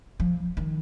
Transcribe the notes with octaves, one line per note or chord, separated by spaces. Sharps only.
F3
D#3